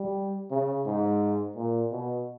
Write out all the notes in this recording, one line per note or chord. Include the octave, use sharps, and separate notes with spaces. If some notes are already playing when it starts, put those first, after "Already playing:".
Already playing: G3
C#3
G#2
A#2
B2